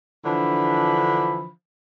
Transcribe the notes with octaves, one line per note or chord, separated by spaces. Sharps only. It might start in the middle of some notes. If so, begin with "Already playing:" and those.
D3 E3 F3 D4 B5